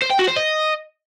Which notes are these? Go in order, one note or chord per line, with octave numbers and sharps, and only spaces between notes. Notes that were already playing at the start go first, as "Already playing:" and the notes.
C5
G5
F#4
C5
D#5